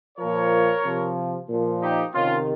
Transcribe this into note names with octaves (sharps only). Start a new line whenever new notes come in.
A#2 F3 A#4 C#5
C3 F3
A#2 F3
D#4 G4
C3 D#3 C#4 F4